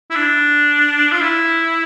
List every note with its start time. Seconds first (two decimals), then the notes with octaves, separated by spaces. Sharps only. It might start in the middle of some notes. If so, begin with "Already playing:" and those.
0.10 E4
0.15 D4
1.12 F4
1.21 E4